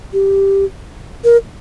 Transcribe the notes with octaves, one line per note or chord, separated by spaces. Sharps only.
G4
A#4